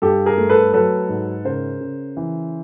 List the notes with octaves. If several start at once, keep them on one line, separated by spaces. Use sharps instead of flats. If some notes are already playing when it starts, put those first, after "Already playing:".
G2 G4 A4
G#4 A#4
A3
A4 B4
F#3 A4 B4
G#2
C#3 A#4 C5
C#3
E3